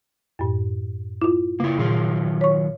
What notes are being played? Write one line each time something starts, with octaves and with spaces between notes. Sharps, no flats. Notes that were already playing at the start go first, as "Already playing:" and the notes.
F#2 A2
E4 F4
C#3 A#3 E4
A#2 D#3 F#3 F4
C#5 C#6